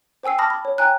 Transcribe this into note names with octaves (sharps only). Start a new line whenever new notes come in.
C5 G5 G#5 E6 C7
A5 B5 D6 D#6 F6 A#6
B5
C#5
G5 G#5 A#5 F#6